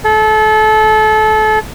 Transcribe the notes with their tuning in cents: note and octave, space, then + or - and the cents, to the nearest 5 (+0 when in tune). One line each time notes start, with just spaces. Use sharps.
A4 -30